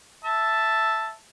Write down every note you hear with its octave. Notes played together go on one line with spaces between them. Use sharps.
E5 A5